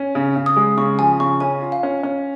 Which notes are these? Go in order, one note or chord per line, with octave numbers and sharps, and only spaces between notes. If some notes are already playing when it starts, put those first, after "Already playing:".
Already playing: C#4
C#3
C#3
D#6
G#3
C#3 C#6
F3 G#5
C#3 C#6
C#4 G#5
F4
F5
C#4
C#4